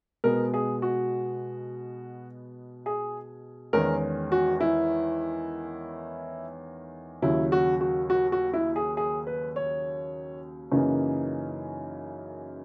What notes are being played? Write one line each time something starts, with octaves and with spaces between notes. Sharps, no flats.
B2 G#3 B3 A#4
G#4
F#4
G#4
E2 D#3 G#3 C#4 A#4
F#4
E4
D#2 C#3 F#3 E4
F#4
F#4
F#4
F#4
E4
G#4
G#4
B4
C#5
F#2 C#3 E3 A#3 D#4